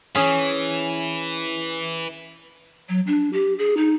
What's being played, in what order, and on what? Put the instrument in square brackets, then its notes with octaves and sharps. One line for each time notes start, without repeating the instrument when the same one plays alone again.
[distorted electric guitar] E3 [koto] C#4 G#4
[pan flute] F#3
D4
G4
G#4
D#4